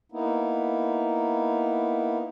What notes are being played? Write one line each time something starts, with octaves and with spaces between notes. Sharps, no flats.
A#3 B3 D#4 E4